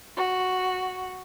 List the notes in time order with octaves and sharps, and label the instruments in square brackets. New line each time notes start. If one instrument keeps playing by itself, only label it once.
[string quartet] F#4